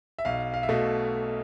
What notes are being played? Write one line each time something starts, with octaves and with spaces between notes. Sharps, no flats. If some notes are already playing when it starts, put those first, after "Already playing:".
E5
B1 F5
F5
E5
B2 A3